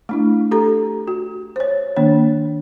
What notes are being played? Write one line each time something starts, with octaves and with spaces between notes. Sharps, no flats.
A3 D4 E4
G4 A4 A#5
F#4
C5 C#5
D#3 A#3 D4 C#5